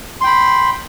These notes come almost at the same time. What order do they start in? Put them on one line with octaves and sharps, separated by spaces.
C6 G5 B5